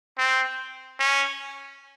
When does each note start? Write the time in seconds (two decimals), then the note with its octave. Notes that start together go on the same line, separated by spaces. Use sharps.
0.18 C4
0.99 C#4